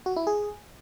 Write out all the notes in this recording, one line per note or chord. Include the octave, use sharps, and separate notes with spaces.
F#4
E4
G#4